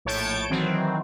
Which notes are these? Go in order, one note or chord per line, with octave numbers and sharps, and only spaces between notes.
A#1 A2 C#5 A5 G6 D7
D#3 E3 F#3 C4